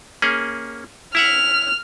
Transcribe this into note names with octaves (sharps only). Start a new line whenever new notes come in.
A#3 C#4 G#4
E4 E5 F#5 F6